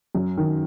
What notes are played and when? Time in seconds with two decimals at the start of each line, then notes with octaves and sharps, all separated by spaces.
0.15 F#2
0.37 D#3